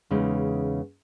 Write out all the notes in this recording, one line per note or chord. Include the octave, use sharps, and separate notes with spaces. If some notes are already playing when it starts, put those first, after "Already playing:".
E2 C#3 G#3 D#4